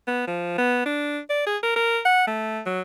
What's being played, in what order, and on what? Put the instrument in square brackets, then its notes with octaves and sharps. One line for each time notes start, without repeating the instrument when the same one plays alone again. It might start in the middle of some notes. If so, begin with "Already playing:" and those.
[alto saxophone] B3
F3
B3
D4
D5
G#4
A#4
A#4
F#5
A3
F#3